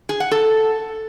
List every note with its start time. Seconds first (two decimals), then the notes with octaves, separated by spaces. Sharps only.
0.09 G#4
0.20 F#5
0.31 A4